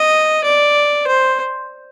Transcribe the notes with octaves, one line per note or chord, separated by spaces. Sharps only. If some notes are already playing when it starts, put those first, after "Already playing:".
Already playing: D#5
D5
C5